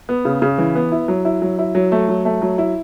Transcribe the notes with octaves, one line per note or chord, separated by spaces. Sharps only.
B3
C#3
C#3
E3
B3
E4
F#3
E4
F#3
E4
F#3
A3
F#3
A3
F#3
E4